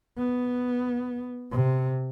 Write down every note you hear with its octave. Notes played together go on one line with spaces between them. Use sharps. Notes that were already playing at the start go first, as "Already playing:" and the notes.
B3
C3